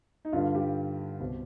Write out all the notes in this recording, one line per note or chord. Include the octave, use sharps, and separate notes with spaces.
D#4
G2 D3 G3 F4
G3 G4
C2 B2 G3 C4